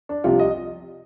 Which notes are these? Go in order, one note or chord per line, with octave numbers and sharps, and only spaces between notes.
D4
C2 C3 F3 F4
D#5